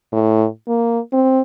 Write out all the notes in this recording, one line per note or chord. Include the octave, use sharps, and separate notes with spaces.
A2
A#3
C4